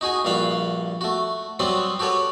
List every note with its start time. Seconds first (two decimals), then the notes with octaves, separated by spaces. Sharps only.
0.01 D#4 F#4 G#4 G#5
0.25 A#1 G2 F#4 F5 F#5 B5
1.01 A3 F#4
1.59 F#3 G3 B3 C4 F#4 B4
1.99 F#4 G4 A4 B4 C#5